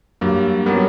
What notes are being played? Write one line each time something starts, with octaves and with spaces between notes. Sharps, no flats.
G2 F#3 A#3
F#3 G3 B3 C#4 F#4 A#4